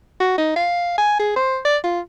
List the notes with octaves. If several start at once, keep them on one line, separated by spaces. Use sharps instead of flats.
F#4
D#4
F5
G#5
G#4
C5
D5
F4